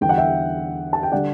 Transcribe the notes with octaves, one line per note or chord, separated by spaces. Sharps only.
E2 D3 G3 G5
F#5
E5 G5
A5
G5
D3 G3 D4 D5 F#5